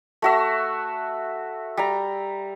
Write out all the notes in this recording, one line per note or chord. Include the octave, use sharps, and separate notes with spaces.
A3 F#4 E5
G3 A#5